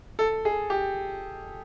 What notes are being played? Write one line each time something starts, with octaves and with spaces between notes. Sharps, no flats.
A4
G#4
G4